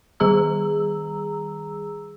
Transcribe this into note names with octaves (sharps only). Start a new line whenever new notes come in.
D#3 G3 G#4 A#5 E6